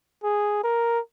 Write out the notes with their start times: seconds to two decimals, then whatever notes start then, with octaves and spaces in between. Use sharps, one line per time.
0.24 G#4
0.64 A#4